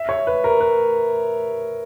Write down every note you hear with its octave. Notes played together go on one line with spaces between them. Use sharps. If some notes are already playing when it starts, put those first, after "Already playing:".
Already playing: E5
C#5
B4
A#4
B4